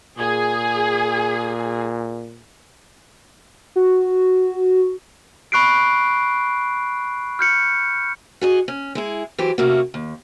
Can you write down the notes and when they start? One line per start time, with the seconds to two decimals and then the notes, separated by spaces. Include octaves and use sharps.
0.19 A#2 G#4
3.76 F#4
5.52 B5 C#6 F#6 C7 D7
7.39 F6 G6 C#7
8.41 F#4 G#4 D#5
8.68 C#4
8.95 G#3 E4 G#4
9.38 E3 F#3 G4 C5
9.58 C3 A3 A#3 C#4 F#4
9.94 D#2